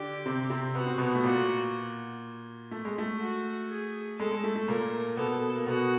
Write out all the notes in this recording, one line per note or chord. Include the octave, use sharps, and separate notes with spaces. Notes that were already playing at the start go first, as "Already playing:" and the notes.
Already playing: D3 D4 G4
C3 C4
C3 C4
B3 F#4
C4
B2 B3
A3
A#2 A#3 F#4
A3
G#3
A3
F#4
G#4
G#3 A4
G#3
A3
A3
A#2 A#3 A#4
B2 B3 A4
A#3
B2 B3 F#4